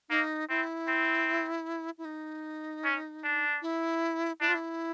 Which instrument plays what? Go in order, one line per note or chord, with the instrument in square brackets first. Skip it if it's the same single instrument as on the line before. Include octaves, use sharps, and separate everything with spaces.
[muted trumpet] A#3 [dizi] D#4
[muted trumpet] C4 [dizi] E4
[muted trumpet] C4
[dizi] E4
D#4
[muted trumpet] C#4
D4
[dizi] E4
[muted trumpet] D4 [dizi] E4
[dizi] F4
E4